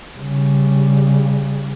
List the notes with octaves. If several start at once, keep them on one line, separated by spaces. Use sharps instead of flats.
C#3 G3